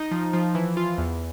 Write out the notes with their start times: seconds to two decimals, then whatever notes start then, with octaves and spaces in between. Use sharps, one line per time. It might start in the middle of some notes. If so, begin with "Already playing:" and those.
Already playing: D#4
0.11 F3
0.33 F3
0.55 E3
0.77 F4
0.98 E2